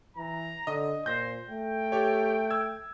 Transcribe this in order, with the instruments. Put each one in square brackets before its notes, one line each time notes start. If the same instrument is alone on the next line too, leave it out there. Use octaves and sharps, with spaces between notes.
[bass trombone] E3 [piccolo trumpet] A#5
[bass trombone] D3 [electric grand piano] D#5 D#6
[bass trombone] A#2 [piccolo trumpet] C5 [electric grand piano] G6 A#6
[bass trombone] A3 [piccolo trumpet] G5
[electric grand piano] G4 A4 C#5
E6 G#6